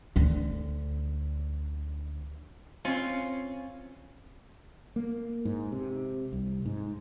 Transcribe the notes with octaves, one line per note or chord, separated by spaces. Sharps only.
D2 D3
C4 C#4 F4
A#3
G#2
C3
C2
G#2